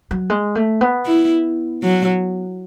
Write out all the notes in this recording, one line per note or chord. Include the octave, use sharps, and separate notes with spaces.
F#3
G#3
A3
B3
E4
F#3